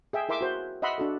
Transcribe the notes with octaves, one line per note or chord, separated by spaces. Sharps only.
G#4 E5 G5
E4 A#4 E5 C6 D6
F#4 C5
D#5 E5 F#5 B5 C6 E6
D4 F#4 A4